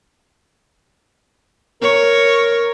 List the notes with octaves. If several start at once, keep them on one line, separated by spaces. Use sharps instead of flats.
A#4 C#5